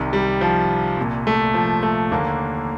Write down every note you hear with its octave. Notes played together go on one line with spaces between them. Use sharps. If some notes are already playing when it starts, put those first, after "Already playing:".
Already playing: C2 C3 D#3
G3
F3
C2 A#2
A3
F3
A3
D#2 D3 A#3